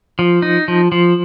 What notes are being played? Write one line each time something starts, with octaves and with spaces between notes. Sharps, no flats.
F3
D#4
F3
F3